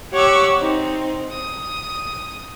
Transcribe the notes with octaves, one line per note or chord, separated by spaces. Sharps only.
G4 C#5 F#5 C#6 D6 E6
C4 D#4
D#6